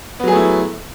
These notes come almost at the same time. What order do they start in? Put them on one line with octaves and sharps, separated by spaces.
B3 F#3 G#4 A3 E4